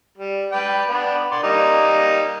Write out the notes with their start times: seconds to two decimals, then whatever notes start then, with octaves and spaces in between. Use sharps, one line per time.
0.17 G3
0.52 B4 D5 G5
0.89 B3 D4
1.31 D5 C6
1.43 G3 A#3 D#4